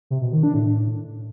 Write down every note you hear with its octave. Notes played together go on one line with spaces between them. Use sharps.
C3
B2
D#3
D4
A2